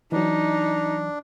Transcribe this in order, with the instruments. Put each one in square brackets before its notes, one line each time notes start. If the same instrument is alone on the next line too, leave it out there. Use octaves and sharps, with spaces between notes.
[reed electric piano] E3 F#3 [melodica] D4 [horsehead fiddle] D#4